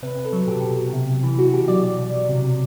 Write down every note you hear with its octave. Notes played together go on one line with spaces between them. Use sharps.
C3 B4
C3
A4
F#3
B2 G4
B2
F#3
C3
C3
E3
B2 F#4
B2 G4
F#3 D5
B2
B2
F#3
C3
C3